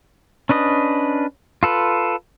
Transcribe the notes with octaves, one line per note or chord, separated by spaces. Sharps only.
C#4 D4 B4 D#5
F4 A4 B4